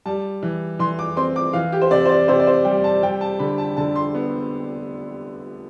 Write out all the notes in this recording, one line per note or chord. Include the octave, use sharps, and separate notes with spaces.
G3 A5
E3
E3 C6
D6
C4 C6
D6
E3 F5
G4
C5
C3 D5
C5
D5
C3 C5
D5
C5
G3 G5
A5
G3 G5
A5
D3 B5
A5
D3 A5
C6
B3